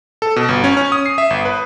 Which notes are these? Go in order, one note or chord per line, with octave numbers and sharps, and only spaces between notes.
A4
B2
G1
C#4
C#4
D#6
C7
E5
G1
B4